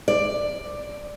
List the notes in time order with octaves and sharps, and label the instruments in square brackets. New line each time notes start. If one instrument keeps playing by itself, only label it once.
[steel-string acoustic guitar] D5